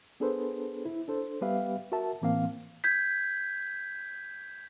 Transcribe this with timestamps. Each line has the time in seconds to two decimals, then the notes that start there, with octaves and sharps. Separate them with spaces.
0.20 B3 D4 G#4 A4 B4 C5
0.85 E4
1.08 D4 A4 C5
1.41 G3 B3 G4 B4 E5 F5
1.92 F#4 A#4 E5 A5
2.21 A2 E3 A#3 C4 F5
2.84 G6 G#6 B6